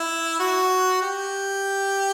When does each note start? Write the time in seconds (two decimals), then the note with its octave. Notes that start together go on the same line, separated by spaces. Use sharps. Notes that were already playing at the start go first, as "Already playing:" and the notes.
Already playing: E4
0.40 F#4
1.02 G4